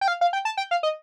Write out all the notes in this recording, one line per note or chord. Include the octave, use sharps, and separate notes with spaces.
G5
F5
F5
G5
A5
G5
F5
D#5